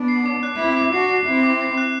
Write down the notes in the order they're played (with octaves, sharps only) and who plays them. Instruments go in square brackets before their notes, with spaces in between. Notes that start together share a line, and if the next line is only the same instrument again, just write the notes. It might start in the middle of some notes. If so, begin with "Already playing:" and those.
Already playing: [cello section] B3 D4
[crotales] C7
D6
F#6
[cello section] C4 E4 [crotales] D6
[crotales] D6
[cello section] D4 F#4 [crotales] C7
[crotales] C7
[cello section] C4 E4 [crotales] C7
[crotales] D6
C7
F#6